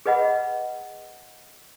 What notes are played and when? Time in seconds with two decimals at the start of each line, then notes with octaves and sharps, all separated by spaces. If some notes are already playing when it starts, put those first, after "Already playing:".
0.06 G#4 B4 D#5 F#5 B5